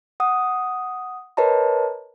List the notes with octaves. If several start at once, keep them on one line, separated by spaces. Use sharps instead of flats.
F#5 D#6
A#4 B4 C#5 D#5 A5 A#5